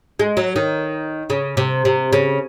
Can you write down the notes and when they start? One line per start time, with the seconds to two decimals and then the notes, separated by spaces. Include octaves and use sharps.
0.19 G#3
0.37 F#3
0.56 D#3
1.30 C#3
1.57 C3
1.85 C3
2.13 C#3